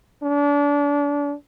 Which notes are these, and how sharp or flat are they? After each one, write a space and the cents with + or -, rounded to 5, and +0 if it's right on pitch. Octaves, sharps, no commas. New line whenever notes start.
D4 -30